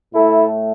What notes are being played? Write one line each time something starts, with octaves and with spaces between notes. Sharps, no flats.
A2 A3 E4 A4